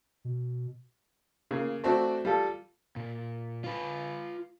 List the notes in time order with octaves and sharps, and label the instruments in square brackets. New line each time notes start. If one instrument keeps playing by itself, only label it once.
[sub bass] B2
[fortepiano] C#3 A#3
A3 C4 D4 F#4
G3 F4 A4
[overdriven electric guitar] A#2
F4 B4